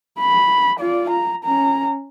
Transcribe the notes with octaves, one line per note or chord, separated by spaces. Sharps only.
B5
F4 D5
A#5
C#4 A#5